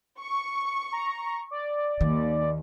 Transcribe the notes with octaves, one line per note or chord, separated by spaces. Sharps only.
C#6
A#5
D5
D#2 D#3